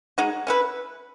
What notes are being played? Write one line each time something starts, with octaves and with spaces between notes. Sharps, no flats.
G#3 D#4 F#4
C#4 E4 B4